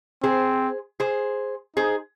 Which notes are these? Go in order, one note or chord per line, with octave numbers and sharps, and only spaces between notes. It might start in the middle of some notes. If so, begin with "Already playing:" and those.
C4 G#4 C5
G#4 C5
D#4 G#4 C5